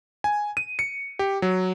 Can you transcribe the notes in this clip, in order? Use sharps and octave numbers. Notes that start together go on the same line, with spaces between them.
G#5
D#7
C#7
G4
F#3